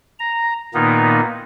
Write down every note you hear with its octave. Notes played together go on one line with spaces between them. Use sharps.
A#5
A#2 D#3 A#3 B3 D#4